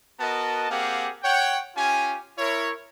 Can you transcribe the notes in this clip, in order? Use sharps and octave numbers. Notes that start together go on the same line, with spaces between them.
B3 F#4 A#4 D#5 A5
A#3 C4 G4 G#4 F5 F#5
C#5 F#5 G5
C#4 F4 G4 G#5
E4 A#4 C#5